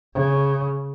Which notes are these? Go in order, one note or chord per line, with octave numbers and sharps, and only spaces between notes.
C#3